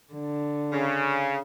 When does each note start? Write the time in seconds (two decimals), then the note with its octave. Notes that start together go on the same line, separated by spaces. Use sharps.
0.13 D3
0.72 C#3